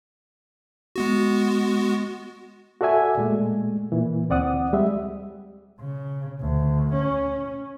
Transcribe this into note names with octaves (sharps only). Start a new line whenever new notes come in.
G#3 B3 F#4
F#4 A4 D5 E5 G#5
A#2 G#3 A3
A#2 E3
D2 C4 D5 F#5 D#6
G3 G#3 E5
C#3
D2
C#4